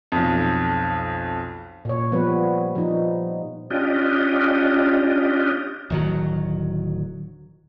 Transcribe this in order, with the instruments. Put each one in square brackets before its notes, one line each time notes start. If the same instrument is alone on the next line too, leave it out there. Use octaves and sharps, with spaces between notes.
[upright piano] B1 F2
[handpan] A#2 C#5
F3 G3 B3 B4
F3 D#4
[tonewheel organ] C#4 D4 F4 G4 D#5
[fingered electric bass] D1 D#3 F#3